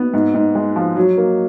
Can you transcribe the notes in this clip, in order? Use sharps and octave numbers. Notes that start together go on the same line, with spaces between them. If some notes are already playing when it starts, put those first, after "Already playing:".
Already playing: B3
G#2
G#2
G#3
F3
F#3
A#3